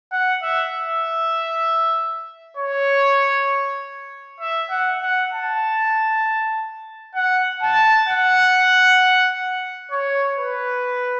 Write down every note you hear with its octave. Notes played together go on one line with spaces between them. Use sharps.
F#5
E5
E5
C#5
E5
F#5
F#5
A5
F#5
A5
F#5
C#5
B4